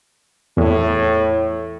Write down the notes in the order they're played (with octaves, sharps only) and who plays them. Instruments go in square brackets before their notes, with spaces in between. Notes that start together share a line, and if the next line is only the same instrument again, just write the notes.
[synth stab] E2 [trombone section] A2